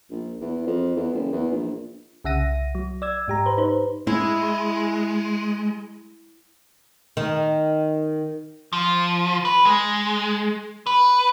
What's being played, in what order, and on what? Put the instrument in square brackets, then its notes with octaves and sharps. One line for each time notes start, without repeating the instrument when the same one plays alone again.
[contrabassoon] A#1
E2
F2
E2
F#1
E2
A#1
[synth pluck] C2 C#3 E5 F#5 A#6 D#7
F#3
D5 E6 G#6
G#2 G4 A#5
B4 C5
D#4 B4 C5
[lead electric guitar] G#3 [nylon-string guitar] E4
[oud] D#3
[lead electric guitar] F3
B4
G#3
B4